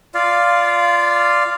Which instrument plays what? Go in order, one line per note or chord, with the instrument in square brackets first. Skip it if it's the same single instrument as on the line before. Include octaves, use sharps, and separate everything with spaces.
[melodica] F4 D5 F5